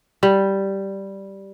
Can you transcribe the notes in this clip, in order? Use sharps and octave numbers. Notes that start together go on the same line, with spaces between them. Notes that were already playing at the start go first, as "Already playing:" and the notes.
G3